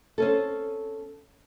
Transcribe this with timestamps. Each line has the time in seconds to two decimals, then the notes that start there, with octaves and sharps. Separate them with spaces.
0.18 C4 C#4 A4